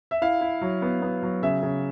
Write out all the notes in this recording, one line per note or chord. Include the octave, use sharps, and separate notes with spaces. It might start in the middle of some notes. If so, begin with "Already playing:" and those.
E5
E4 F5
E4
F#3
B3
B3
F#3
C#3 E5
C#3